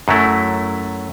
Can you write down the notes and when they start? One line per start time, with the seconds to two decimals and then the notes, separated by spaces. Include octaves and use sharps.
0.08 F#2 F#3 A3 E4